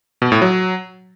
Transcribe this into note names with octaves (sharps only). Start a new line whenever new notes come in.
B2
A2
F#3